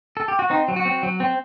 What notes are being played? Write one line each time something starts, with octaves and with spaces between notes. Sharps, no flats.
A4
G4
F#4
C4 D#4
F#3
F#4
C4
F#3
C4